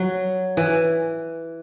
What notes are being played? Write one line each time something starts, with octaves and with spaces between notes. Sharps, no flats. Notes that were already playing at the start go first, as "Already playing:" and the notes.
Already playing: F#3
E3